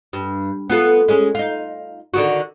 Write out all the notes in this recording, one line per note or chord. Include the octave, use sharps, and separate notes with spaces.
G2
B3 F4 A4
G#3 C#4
D#4 F4
D3 D#3 F#4